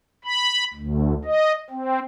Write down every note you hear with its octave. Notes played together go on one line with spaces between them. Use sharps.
B5
D2
D#5
C4